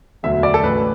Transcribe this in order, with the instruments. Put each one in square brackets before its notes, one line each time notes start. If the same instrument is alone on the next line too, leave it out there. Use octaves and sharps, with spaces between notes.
[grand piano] E1 D2 D3 F#3 E5
D5
A4
A1 A2 E3 B4